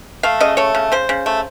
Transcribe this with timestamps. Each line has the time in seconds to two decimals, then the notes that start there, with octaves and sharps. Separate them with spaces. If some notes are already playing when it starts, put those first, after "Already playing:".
0.23 A3 F5
0.41 C#3 D#5
0.57 A3 C#5
0.75 C#3
0.92 C#3 C5
1.09 C#3
1.26 A3